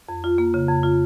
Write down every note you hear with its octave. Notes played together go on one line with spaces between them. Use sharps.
F2
F4
A#3
C#3
F2
F4